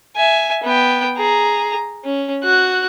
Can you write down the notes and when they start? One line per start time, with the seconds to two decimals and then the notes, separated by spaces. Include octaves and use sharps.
0.16 E5 G#5
0.63 B3 G5
1.17 G#4 A#5
2.04 C#4
2.44 F#4 F#6